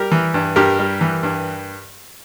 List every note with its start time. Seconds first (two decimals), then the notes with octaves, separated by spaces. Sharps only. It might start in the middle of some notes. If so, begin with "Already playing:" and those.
Already playing: G3 G4 A#4
0.12 E3
0.34 G2
0.56 G2 G4 A#4
0.79 G3
1.01 E3
1.23 G2